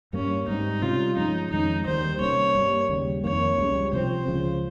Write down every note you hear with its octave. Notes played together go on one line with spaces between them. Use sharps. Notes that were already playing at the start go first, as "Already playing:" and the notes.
G2 G3 A#3 C#4
G#2 G3 C4 D#4
C3 G3 C#4 F4
G2 F3 G#3 C#4 D#4
F2 D#3 G#3 C#4 D#4
D#2 D#3 G3 C5
C3 G3 A#3 C#4 C#5
G2 G3 A#3
D#2 C#3 G3
F2 D#3 A#3 C#5
C#2 C#3 G3
C3 F3 C4 C5
C#2 C#3 F3